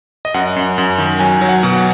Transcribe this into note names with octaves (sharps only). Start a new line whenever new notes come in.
D#5
F#2 F#5
F#2
F#2
D#3
F#3 G#5
F#3
F#5
B2
F#5